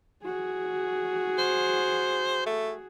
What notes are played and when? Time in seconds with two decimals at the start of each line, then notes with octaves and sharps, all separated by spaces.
0.24 F#4 G#4
1.38 C5
2.46 A3